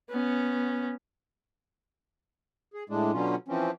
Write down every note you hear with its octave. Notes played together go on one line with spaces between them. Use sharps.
B3 C#4
G#4
A2 G#3 D4
B2 D3 F#3 C#4 F4
E3 F3 C4 C#4